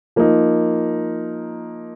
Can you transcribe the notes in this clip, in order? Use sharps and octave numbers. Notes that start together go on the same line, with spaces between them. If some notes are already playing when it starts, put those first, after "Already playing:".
F3 A#3 D#4